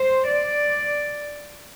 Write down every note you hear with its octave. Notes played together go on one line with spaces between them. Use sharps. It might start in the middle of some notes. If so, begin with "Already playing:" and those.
Already playing: C5
D5